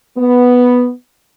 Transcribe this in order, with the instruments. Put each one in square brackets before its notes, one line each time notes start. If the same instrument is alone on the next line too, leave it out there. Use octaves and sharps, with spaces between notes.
[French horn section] B3